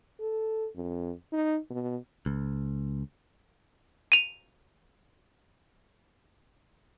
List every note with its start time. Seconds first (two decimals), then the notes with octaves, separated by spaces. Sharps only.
0.20 A4
0.75 F2
1.32 D#4
1.70 B2
2.26 C#2
4.12 D#7 F7